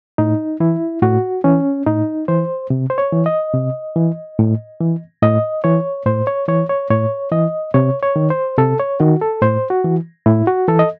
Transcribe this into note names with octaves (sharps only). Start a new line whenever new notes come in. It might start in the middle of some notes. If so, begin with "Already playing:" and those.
A2 D#4
E3 E4
A2 F#4
E3 C#4
A2 D#4
E3 C5
C3
C5
C#5
E3
D#5
C3
E3
A2
E3
A2 D#5
E3 C#5
A2 C5
C#5
E3 C#5
C#5
A2 C#5
E3 D#5
C3 C#5
C#5
D#3
C5
C3 A4
C#5
D#3 F#4
A4
A2 C5
F#4
E3
A2 E4
F#4
E3 A4
D#5